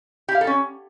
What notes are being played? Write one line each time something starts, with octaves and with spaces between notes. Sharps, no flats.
G4
F5
A4
C#4